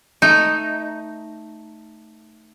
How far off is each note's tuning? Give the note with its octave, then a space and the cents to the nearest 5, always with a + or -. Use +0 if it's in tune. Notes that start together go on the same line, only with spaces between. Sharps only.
A3 +5 D#4 +0